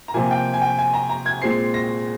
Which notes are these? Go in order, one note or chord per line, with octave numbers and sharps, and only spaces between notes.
A#5
C3 F3 A#3 G#5
G5
G#5
G5
G#5
A#5
A#5
G#6
A#2 G#3 C4 C7
A#6